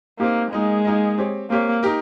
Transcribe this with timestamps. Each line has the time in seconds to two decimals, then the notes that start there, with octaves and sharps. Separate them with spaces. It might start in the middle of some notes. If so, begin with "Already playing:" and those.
0.19 A#3 C4 D#4 G4
0.52 G#3 A#3 D#4 A#4 D#5
0.85 A#3 D#4 A#4 D#5
1.18 C4 G4 C#5
1.50 A#3 C4 G4 C#5
1.83 D#4 G4 A#4